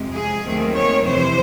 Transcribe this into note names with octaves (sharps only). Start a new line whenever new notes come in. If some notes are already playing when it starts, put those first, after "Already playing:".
Already playing: F2 C3 F3 G#3
G#4
D#2 D#3 F#3 A3 C4
C#5
F2 C3 E3 C5